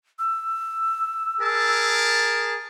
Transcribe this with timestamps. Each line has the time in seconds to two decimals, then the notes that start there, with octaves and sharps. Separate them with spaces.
0.19 E6
1.41 G#4 A#4 A5